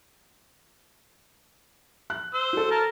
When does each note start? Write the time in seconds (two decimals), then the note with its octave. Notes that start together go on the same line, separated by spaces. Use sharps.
2.10 F#6
2.34 C5 E6
2.53 F#4 A4
2.71 A#4 A5 F6